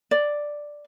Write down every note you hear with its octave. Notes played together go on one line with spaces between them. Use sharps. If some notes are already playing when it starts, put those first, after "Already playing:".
D5